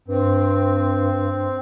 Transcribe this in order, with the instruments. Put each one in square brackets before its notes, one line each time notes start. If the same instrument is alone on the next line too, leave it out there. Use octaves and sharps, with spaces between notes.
[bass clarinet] G2 [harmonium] C4